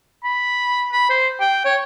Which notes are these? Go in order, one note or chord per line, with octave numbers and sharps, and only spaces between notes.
B5
B5
C5
G5
C#5